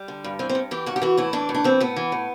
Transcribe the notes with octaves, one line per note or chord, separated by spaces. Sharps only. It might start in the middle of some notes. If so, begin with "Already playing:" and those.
Already playing: G3
D3
G2
E3 C4
C4
G2
E3 G4
G2 F#4
G4
E3 F#4
A2 E4
E3 D4
A2
D4
E3 C4
A2 B3
E3
A2